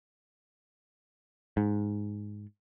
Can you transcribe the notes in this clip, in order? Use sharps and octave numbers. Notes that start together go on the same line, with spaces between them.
G#2